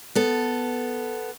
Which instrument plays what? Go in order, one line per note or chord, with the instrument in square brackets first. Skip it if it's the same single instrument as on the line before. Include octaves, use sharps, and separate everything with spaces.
[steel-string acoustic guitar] B3 A4